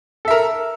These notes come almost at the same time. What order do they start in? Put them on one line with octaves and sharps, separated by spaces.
A4 E5 A#4